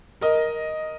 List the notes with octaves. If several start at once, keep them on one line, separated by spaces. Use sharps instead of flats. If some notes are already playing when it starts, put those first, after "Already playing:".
A#4 D#5